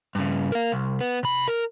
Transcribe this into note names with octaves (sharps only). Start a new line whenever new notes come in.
G2 C#3
A#4 F5
C2
B3
C3 B5
A#4